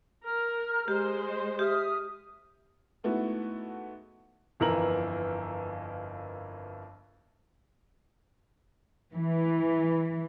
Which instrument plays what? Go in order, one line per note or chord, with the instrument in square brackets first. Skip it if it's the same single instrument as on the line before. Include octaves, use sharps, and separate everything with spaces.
[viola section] A#4 [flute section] A#5 F6
[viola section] G#3 C5 [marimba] G4
[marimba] G4 [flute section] E5 D#6 F6
[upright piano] G#2 A3 B3 E4 F#4
[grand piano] G1 F2 E3 A#4 A#5 F#7
[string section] E3